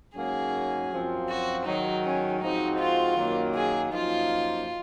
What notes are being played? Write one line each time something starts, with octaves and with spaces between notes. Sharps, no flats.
G#2 F#3 A#3 C#4 G#4
F#2 F3 C4 F4
F#4
G#2 D#3 F#3 D#4
C#4
G#2 F3 C4 D#4 F#4
F4
F#2 D#3 F#3 A#3
G#4
F#2 F3 A#3 D#4 F4